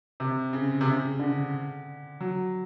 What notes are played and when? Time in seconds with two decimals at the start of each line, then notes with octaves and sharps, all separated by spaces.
0.20 C3
0.53 C#3
0.81 C3
0.86 C#3
1.19 D3
2.20 F#3